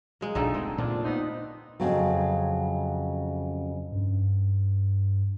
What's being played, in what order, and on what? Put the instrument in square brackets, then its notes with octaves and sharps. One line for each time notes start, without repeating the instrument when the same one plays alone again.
[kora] G#3 A#3
[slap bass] A#1 A2 F3 [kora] D3 A3 D#4
[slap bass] G#3 [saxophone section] C4
[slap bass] A#2 [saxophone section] D4 F4
[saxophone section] B3 C4 D#4
[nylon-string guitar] F2 C#3 F#3
[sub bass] G2